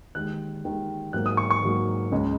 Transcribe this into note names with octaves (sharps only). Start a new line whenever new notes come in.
D#2 D#3 G#3 F#6
D#2 D#3 G#3
G#2 F#3 A#3 F#6
D#6
C#6
C#6
G#2 F#3 A#3
C#2 C#3 G#3